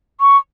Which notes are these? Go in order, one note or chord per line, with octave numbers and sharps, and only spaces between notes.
C#6